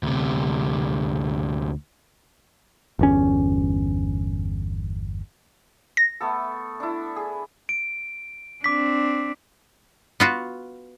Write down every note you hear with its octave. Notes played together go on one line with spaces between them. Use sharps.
D2 C3
G1 E2 C#4
A#6
A3 B3 A4
D4 E4
G#4
D7
C4 D4 D6 B6
B3 F4 F#4